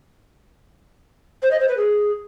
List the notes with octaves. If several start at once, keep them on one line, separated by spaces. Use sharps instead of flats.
C5
D#5
C5
B4
G#4